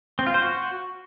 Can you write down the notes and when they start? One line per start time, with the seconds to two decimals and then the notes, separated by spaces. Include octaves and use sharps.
0.19 C4
0.27 F4
0.34 C5
0.42 F#4